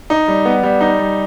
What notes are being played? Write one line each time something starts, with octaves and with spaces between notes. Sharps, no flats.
D#4
G3
B3
G3
D#4
G3